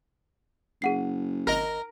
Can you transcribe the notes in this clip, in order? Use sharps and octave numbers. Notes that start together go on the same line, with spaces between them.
F#1 G#4 F#5 C7
G#1 A#4 D#5